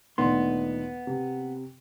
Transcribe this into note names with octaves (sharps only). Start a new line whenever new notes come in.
D2 A#2 D#3 B3 C6
C3